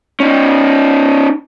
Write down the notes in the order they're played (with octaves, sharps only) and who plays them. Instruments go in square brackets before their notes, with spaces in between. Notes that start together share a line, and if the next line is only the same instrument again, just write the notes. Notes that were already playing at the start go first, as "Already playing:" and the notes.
[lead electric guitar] C#4 D#4